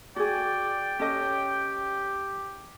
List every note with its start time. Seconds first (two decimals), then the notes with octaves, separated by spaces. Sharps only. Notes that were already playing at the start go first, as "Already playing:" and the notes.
0.16 F#4 G#4 D5 G5
0.99 C#4 G4 A4 D#5